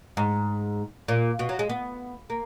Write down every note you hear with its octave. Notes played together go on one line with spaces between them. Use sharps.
G#2
A#2
B2
F#3
G#3
B3
A#3